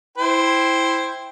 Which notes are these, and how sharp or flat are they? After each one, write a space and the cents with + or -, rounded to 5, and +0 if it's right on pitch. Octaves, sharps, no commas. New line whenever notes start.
E4 +0 C5 +0 G5 +0